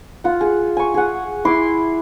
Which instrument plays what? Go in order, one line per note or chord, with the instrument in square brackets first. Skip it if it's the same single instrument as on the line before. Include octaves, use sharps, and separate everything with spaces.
[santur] F4 F#5
G#4
G#5 C#6
G#4 F#5
E4 C6 D6